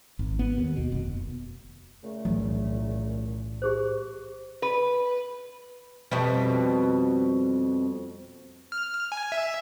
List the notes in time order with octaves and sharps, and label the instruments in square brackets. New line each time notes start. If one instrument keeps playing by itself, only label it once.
[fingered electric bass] G#1
B3
D#2
B2
F1
[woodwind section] A#2 C#3 A3
[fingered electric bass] B1 E3 F#3 [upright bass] A2
[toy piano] G4 G#4 C5
[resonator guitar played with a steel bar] B4
[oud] F2 B2 G3
[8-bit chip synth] F6
G#5
E5